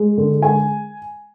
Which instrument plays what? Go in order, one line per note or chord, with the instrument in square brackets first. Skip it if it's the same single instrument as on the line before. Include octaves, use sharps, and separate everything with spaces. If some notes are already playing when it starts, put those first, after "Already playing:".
Already playing: [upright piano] G#3
D3
G#3 G#5